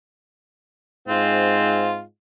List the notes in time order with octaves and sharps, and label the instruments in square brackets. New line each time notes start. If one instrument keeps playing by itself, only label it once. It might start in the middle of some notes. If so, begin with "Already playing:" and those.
[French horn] G#2 [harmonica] C4 F4